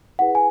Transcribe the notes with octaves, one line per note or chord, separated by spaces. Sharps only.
E4 G#4 B4 F#5
G#5